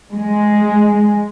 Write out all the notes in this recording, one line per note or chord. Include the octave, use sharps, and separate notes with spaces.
G#3